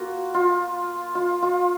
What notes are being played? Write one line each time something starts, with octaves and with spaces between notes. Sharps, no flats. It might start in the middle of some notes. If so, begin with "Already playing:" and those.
Already playing: A#3 F4 F#4
F4
F4
F4